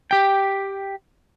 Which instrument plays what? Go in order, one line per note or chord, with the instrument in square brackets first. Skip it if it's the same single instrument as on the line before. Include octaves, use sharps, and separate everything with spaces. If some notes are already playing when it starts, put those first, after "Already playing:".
[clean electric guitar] G4 G5